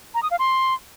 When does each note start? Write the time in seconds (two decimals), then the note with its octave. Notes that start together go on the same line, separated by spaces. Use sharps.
0.14 A#5
0.23 D#6
0.31 F5
0.39 C6